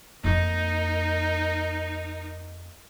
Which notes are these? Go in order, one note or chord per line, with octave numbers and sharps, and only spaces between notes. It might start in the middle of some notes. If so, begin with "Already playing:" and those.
F2 A#3 D#4 A#4